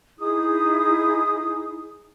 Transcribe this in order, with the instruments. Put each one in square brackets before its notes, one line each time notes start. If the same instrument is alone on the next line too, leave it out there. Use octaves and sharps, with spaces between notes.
[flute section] D#4 E4 G#4 D#6